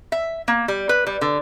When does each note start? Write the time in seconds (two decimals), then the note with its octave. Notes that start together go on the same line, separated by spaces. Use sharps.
0.12 E5
0.48 A#3
0.68 G3
0.89 B4
1.07 G3
1.21 D3